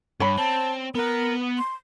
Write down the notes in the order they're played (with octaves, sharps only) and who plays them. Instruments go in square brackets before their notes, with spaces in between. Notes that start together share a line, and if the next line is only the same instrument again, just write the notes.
[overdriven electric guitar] G2 [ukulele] C#5 B5
[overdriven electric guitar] C4 [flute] A5
[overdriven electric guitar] B3 F#5 [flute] A#4
[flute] C6